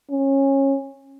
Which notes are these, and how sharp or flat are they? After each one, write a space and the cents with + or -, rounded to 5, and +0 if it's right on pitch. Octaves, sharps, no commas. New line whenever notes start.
C#4 -20